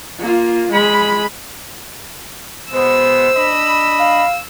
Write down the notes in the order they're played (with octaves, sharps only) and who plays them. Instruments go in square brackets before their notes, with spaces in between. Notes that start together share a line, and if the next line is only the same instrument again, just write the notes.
[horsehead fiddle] A#3 F4
G#3 B5
[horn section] B2 G#3 B3 [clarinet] C5 [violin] E6
[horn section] D4 D#5 B5
[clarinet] F5